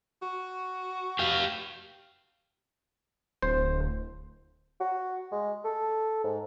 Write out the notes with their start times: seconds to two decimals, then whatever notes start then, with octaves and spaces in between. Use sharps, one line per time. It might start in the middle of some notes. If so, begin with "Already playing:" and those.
0.22 F#4
1.19 G4 F5
3.42 D1 C5
4.80 F#4
5.32 G#3
5.65 A4
6.24 G#2